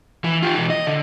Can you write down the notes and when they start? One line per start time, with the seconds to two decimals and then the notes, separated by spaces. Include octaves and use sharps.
0.24 E3
0.42 F4 G4
0.55 B2 E3
0.70 D#5
0.87 D3